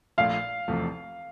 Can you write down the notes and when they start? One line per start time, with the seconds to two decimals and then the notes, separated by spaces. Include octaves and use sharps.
0.18 A#1 A#2 A3 F5
0.68 F1 E2 C3 F3 A3